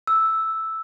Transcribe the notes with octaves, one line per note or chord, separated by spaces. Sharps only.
E6